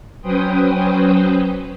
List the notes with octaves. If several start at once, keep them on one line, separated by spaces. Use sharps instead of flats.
F#3 C#4 B4 C5 G5 D#6